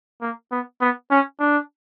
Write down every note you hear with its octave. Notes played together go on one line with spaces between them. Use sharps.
A#3
B3
B3
C#4
D4